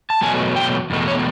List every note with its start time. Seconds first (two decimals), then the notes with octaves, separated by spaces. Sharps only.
0.10 A5
0.21 E2 B2 F#3 A3 G#5
0.56 G5
0.90 E2 B2 A3
1.07 C#5